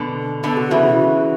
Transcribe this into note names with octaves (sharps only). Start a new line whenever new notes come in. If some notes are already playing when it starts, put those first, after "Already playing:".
Already playing: B2 D3
B2 D3 A4
F#4
C#3 E3 E4
F#4
F#4